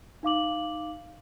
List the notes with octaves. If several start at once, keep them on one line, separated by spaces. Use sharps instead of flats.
D#4 F5 D6 F#7